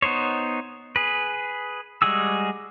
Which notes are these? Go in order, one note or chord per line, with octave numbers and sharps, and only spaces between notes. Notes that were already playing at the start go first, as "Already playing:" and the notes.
B3 D#4 C5 C#5
G#4 B4
G3 G#3 F#4 G#4 E6